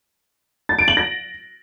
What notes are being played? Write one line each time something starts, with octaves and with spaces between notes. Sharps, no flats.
A6
D7
F#7
A#6